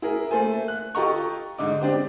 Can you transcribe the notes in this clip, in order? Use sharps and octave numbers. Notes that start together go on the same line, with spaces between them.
E4 G#4 A#4
A3 A#3 A4 C5 G#5
F#6
F4 G4 A4 D#5 A#5 C#6
G#2 D3 D#4 D6
C4 D4 G4 C5